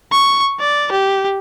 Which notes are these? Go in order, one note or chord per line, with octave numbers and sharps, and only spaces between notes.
C#6
D5
G4